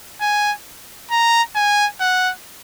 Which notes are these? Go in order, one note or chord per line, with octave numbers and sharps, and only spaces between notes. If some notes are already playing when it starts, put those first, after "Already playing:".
G#5
A#5
G#5
F#5